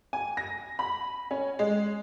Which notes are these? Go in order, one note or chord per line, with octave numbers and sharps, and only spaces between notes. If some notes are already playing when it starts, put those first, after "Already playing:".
G#5
A#6
B5
C#4
G#3